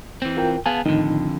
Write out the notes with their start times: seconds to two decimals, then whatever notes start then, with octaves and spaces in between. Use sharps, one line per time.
0.22 E3 C4
0.37 F4 A#4 G5
0.66 B3 G#4 F5 G#5 A5
0.86 F2 A2 D3 D#3 D#4